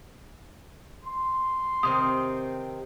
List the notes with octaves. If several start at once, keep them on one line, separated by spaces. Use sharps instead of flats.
C6
C3 D#3 C4 D#6